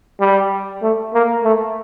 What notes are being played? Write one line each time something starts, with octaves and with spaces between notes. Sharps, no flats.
G3
A3
A#3
A3